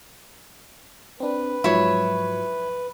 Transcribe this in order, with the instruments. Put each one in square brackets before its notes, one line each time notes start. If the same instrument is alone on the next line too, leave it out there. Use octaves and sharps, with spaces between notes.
[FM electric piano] C4 D4 [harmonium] B4
[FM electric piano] G#2 F3 F#3 [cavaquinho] E4 C#5